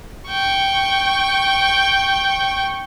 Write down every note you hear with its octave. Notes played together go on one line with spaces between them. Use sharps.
G5 C#6